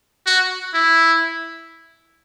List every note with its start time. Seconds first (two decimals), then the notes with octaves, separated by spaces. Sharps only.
0.26 F#4
0.74 E4